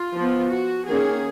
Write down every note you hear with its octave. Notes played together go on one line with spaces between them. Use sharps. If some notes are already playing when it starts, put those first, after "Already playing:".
Already playing: F4
F3 B3
F#4
D#3 A#3 C#4 G#4